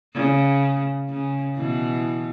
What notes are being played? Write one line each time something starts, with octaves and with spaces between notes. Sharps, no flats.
C#3
C#3
B2 E3